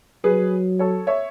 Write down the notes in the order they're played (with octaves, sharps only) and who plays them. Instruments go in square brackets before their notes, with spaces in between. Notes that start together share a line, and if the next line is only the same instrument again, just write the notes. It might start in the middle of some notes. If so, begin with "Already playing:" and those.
[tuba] F#3 [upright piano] G#4 B4
[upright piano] A4 C#5
C#5 E5